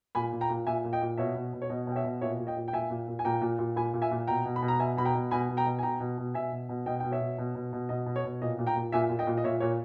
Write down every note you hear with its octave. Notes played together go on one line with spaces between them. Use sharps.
A#2 G#5 B5
A#2
G5 A#5
A#2
A#2 E5 G#5
A#2
D#5 G5
A#2
B2 C#5 E5
B2
B2
C#5
B2 D#5
B2 G5
C#5 E5
B2
A#2 C#5 E5
A#2
D#5 G5
A#2
G5
A#2 E5 G#5
A#2
A#2
G#5
A#2 G5 A#5
A#2
A#2
A#2 G#5 B5
A#2
E5 G#5
A#2
B2 G5 A#5
B2
B5
B2
A#5
B2 E5 G#5
B2 B5
G5 A#5
B2
B2 G#5 B5
B2
G5 A#5
B2
G#5
B2 G5 A#5
B2
B2
B2 E5 G#5
B2
B2
B2 D#5 G5
B2 G5
C#5 E5
B2
B2
B2
B2
B2 D#5
B2
C#5
B2
A#2 D#5
A#2
G5 A#5
A#2
A#2 E5 G#5
A#2
D#5 G5
A#2
D#5
A#2 C#5 E5
A#2 C#5